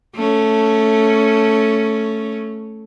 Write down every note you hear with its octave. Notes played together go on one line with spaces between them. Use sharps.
A3 C#4